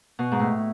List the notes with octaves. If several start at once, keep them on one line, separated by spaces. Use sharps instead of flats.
B2
G#2
A2